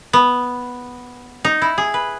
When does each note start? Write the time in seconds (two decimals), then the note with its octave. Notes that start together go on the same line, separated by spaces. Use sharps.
0.13 B3
1.45 D#4
1.62 E4
1.78 G#4
1.94 B4